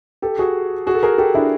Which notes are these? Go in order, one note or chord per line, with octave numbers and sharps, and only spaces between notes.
G4 A4
F#4 G#4
F#4 G#4
A4
G#4 A#4
G4 A4
D4 E4